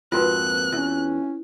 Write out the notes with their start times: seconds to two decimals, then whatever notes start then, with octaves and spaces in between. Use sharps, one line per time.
0.12 F2 G#2 A#3 F4 F#4 B4 F#6
0.72 E2 C#4